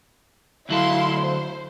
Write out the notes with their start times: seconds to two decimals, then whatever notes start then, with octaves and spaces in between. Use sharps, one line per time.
0.69 D2 F#3 E4 A4 F5 C6
1.18 C5